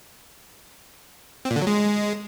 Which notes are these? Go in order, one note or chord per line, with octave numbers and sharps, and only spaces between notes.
C4
A#2
D3
F#3
G#3